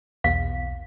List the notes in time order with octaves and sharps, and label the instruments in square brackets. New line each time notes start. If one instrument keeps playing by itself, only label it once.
[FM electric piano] B1 [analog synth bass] E2 [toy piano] F5